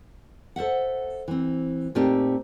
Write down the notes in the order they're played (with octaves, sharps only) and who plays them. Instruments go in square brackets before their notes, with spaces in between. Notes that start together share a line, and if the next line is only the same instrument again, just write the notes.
[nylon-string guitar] A4 C5 E5 F#5
E3 C4
A#2 A3 C4 D#4 G4